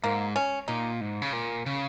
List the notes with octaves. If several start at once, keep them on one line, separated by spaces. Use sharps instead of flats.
G#2 A#3
C#4
A#2 D#4
G#2
C#3
A#2
C#3